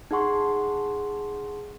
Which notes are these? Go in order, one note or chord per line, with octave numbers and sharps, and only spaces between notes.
D#4 G#4 F#5 C6 C#6